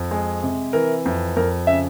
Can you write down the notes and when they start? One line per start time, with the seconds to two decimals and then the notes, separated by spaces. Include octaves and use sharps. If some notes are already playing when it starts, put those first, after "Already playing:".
Already playing: F2
0.11 G#3
0.43 C3
0.73 E3 A#4
1.06 F2
1.36 F2 A#4
1.67 C#3 E5